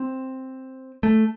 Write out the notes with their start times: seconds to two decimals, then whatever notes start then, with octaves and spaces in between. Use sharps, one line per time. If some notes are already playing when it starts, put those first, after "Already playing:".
Already playing: C4
1.03 A3